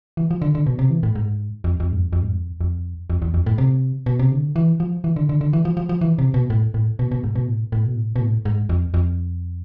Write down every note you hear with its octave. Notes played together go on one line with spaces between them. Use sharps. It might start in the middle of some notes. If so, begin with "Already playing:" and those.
E3
F3
D3
D3
B2
C3
E3
A2
G#2
F2
F2
G#2
F2
F2
G#2
F2
F2
F2
E2
F2
A2
C3
B2
C3
D3
E3
F3
E3
D3
D3
D3
E3
F3
F3
F3
E3
C3
B2
A2
A2
B2
B2
G#2
B2
A2
A2
B2
A2
B2
A2
G#2
F2
F2